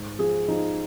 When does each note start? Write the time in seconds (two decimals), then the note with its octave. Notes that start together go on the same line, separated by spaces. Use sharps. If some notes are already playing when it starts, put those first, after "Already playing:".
Already playing: G#2
0.19 F3 G#4
0.48 F3 D#4